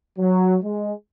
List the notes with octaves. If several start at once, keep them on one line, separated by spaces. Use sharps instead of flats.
F#3
G#3